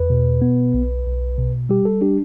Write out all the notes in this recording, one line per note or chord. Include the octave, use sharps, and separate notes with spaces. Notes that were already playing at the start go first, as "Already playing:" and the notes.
Already playing: E2 B4
B2
B3
B1
B1
B2
G3 G4
A4
D4 G4